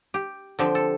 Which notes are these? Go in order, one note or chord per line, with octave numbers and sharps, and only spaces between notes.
G4
D3 F3 C4 G4
A4